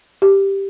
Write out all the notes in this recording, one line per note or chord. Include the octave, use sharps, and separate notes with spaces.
G4